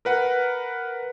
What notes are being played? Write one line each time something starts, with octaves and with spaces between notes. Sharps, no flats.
A#4 B4 F#5